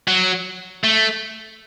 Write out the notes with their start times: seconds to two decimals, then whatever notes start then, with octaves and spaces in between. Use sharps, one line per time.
0.08 F#3
0.84 A3